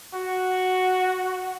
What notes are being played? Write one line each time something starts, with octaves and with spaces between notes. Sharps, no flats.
F#4